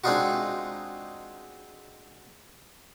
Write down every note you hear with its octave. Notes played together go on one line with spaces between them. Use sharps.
G#3 C4 D4 D#4 F4 F#4